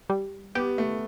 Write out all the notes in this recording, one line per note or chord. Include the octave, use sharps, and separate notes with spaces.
G3
B3 G4
A3